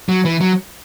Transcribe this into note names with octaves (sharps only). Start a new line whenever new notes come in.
F#3
E3
F#3